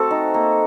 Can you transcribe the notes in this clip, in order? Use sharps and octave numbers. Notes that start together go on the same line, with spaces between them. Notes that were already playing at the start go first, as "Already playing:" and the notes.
Already playing: A3 C4 F#4 A4
D#4
A#3